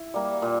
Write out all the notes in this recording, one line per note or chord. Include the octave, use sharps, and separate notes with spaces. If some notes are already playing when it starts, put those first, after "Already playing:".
Already playing: E4
G3 A#3
A#2